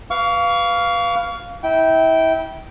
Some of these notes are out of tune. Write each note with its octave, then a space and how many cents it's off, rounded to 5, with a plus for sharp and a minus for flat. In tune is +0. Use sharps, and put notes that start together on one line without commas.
B4 +0 F5 +0 C#6 +40
E4 -30 G5 -15